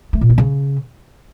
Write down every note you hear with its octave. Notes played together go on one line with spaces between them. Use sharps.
A3
A#2
A#3
C#3